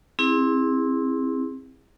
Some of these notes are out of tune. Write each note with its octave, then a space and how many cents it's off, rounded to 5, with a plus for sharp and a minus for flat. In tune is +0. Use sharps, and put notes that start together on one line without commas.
C4 +15 E4 -10 G#4 -25